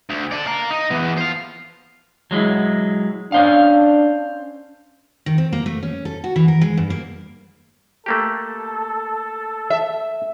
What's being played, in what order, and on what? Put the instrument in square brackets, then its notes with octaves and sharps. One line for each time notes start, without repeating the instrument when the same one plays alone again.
[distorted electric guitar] D2
A4 D5
F5 A#5
D#4
E3 B3
C5 F5
[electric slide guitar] F#3 G#3 E4
[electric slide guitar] C#4 C5 F5 [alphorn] D4
[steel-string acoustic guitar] D#3
C4
A#3
A3
C#4
A4
F#4
E3
A#4
G#3
G2
A#3
[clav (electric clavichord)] A3 A#3 G4 [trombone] A4
[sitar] E5